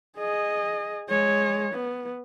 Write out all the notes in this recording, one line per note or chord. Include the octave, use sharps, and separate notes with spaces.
G#4 D#5
G#3 C#5
B3